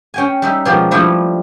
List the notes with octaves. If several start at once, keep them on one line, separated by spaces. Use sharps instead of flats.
C#4 G5 G#5
G3 D#4 E5
B2 F3 G#3 G4 A#4
F3 G3 A3 D4 E4 F4